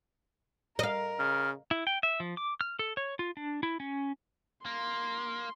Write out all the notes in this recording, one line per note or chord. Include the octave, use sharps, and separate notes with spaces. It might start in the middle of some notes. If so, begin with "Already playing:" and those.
A#4 D#5 F5
C#3 F6
E4
G5
E5
F3
D6
F6
A4
C#5
F4
D4
E4
C#4
A#3 C6